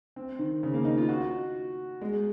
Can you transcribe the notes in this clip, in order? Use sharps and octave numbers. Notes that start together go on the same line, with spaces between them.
C4
D#3
C#3
A#3
D#4
F4
F#4
G#3